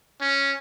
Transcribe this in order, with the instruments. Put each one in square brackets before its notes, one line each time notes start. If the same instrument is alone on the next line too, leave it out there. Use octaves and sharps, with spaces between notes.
[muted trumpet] C#4